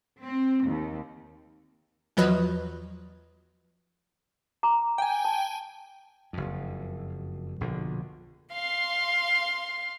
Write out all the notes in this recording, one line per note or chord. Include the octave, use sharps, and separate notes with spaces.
C4
D#2
E2 F3 F#3 B4 D#5
A#5 D6
G5 G#5
A5
F#1 F2
A#1 B2 D3
F5 C6